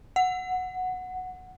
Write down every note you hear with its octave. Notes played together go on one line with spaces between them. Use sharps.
F#5